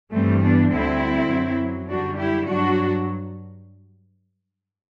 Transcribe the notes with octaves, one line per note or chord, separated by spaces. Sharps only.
G2 E3 G3 A3 C4
B3 D4
D2 D3 G3 C4 E4
F#2 F#3
F#2 D3 G3 D4 F#4
E4 G4
G2 F#3 D4 F#4